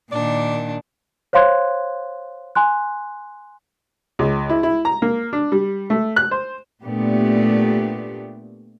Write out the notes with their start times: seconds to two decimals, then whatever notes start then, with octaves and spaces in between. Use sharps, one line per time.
0.12 A#2 D#3 D4 D5
1.33 C5 C#5 F5 C6 F#6 G#6
2.55 G#5 C6 F#6
4.19 C#2
4.49 E4
4.63 E4
4.85 A#5
5.02 A#3
5.33 D4
5.52 G3
5.90 A3
6.16 F#6
6.31 C5
6.84 A#2 A3 B3 D4 G4